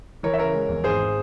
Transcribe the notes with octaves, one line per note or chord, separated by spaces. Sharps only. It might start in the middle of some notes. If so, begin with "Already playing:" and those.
E3 A#4 C#5
E5
C#3 A#4 C#5
G#3
E2
G#1 G#4 C5